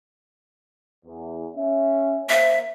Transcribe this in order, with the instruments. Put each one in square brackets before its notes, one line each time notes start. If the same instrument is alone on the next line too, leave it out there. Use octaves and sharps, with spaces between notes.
[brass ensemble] E2
C#4 E5
[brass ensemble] A#3 C5 [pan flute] E5